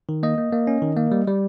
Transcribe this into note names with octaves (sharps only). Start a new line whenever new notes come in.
D#3
A#3 D#5
A#3
A#3
C#4
D#3
A#3
G3
G3